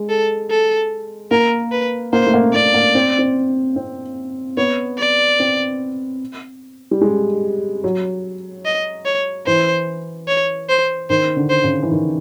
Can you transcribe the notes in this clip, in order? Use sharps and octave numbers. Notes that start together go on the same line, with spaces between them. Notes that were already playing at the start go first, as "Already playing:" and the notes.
Already playing: G#3
A4
A4
A#3 A#4
B4
A#3 C5
A3
A#3
A#3 D5
A#3
C4
C4
C4
B3 C#5
D5
C4
G3
G#3
F#3
D#5
C#5
E3 C5
C#5
C5
D#3 C5
D3
C5
C#3
E3
D#3